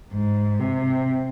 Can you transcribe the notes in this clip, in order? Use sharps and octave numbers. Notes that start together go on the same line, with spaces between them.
G#2
C3